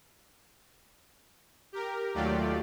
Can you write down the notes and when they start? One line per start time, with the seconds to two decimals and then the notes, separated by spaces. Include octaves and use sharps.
1.72 G4 A#4
2.14 D#2 F#3 A3 F4 G4 D5